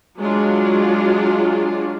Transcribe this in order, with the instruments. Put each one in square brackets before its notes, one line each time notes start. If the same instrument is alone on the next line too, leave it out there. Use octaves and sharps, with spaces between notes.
[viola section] F#3 G#3 D4 F4 F#4